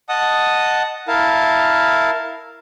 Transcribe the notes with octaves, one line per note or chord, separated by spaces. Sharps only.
D#5 F#5 A5 D#6
E4 A#4 F5 A5